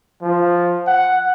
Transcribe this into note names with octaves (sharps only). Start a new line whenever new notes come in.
F3
F#5